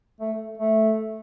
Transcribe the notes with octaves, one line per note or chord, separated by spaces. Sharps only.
A3
A3